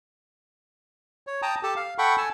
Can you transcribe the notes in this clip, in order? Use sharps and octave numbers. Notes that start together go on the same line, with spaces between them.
C#5
G5 A5 A#5 D#6
G4 A4 A5
F5
A4 F#5 G5 B5 C#6
A4 G#5 A5 E6